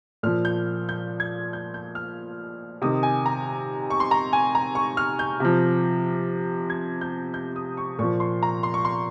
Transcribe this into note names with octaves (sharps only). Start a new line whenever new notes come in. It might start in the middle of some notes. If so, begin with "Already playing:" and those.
A#2 F3 F6
G6
G6
G#6
G6
G6
F6
C3 D#3 D#6
G#5
A#5
C#6
C6
A#5
G#5
A#5
C#6
F6
G6
C3 F3
G#6
G6
G6
D#6
C#6
A#2 F3 C#6
C6
A#5
C6
C#6
C6